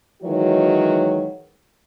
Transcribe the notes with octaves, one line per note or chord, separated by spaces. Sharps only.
D#3 E3 F#3 G#3 F#4 C#5